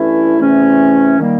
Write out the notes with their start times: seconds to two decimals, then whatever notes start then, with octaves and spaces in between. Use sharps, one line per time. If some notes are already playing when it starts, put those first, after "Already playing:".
Already playing: G2 E3 A3 C#4 E4
0.40 E2 C3 E3 A3 C#4
1.20 D#3 G3 A#3